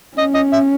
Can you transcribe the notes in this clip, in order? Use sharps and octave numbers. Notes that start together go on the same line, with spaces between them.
C#4 D#5
D#5
E5